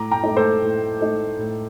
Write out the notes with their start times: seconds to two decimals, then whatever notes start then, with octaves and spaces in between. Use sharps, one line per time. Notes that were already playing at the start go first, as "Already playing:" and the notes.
Already playing: A2 A#5 D6
0.11 G5 A#5
0.23 A3 D#4
0.37 A4 C5
0.62 A2
1.01 A3 D#4
1.39 A2